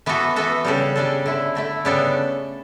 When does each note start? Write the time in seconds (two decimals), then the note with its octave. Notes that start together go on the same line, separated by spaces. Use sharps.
0.06 E3 B3 F#4 A4
0.36 E3 B3 F#4 A4
0.65 C#3 G3 D4 A4
0.96 C#3 G3 D4 A4
1.26 D3 A3 E4
1.55 D3 A3 E4
1.85 C#3 G3 B3 D4 A4